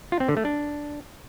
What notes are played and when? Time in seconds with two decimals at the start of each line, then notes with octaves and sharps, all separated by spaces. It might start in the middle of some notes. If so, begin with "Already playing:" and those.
0.12 F4
0.20 C4
0.29 D3
0.37 A3
0.45 D4